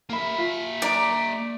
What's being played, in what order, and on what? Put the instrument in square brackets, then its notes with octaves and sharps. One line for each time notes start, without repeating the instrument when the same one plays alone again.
[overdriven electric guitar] A#3 E5 [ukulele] A#4 B5
[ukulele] F4
[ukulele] D4 A#5 [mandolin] D5